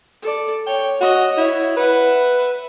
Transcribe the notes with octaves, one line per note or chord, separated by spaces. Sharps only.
A4 D5
C#5 G5
F#4 C#5 D#5
E4 C#5
B4 E5 F#5